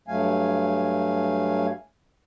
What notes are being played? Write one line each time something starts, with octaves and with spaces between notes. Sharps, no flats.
G2 F#3 A3 F5 G#5